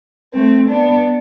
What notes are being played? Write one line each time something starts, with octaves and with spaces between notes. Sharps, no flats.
A3 C4
B3 D4